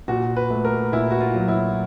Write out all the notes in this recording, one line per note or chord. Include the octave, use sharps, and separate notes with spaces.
A#2 F#4
B4
A3
A#4
A#2 E4
F#4
F4
F#3
E4